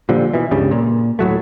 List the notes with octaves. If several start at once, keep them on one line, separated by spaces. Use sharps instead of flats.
A#2 D3 F3 G3
B2 E3
C#2 G2 C#3 G3
A#2
D#1 A2 F#3 A3